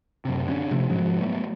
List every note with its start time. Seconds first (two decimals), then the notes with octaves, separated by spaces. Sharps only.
0.25 F#2 C3
0.47 D3 B3 C#4
0.71 C3 F3 A3
0.89 G#2 F3 F#3
1.20 F#3 A3 B3